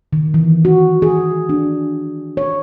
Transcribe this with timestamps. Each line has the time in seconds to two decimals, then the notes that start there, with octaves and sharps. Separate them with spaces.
0.13 D#3
0.34 E3
0.65 F#4
1.02 G#4
1.49 D4
2.37 C#5